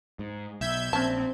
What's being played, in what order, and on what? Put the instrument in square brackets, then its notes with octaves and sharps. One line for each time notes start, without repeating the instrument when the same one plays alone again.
[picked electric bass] G#2
[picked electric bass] B1 [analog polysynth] E5 G6 G#6
[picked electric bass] A#1 [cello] C4 [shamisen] C#4 A5